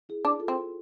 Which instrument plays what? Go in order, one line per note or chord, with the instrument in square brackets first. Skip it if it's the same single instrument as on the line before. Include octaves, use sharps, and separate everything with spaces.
[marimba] E4 G#4
[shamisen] D4
[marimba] F4 A4
[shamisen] C4